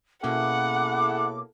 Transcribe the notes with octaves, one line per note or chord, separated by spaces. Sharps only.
B2 A#3 C#4 E4 G#4 A4 F#5 D6